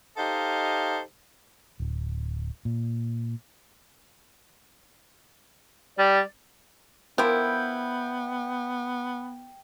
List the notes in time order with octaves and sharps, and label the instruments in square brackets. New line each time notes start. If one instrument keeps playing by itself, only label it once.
[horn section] D#4 G4 A4 C5 D#5 F5
[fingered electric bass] D1
A#2
[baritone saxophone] G3 [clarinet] D5
[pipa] F3 E4 [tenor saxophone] B3 [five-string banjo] A#4 [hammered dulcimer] G5